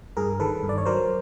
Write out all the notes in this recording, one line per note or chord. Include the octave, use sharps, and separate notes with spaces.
G2 G#4 A#4
D#3 A4 B4
G2
D5
C#5
F#3 A#4 C5